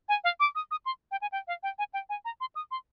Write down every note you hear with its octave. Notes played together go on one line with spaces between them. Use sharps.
G#5
F5
D6
D#6
D#6
C6
G5
G#5
G5
F5
G5
G#5
G5
G#5
A#5
C6
D#6
C6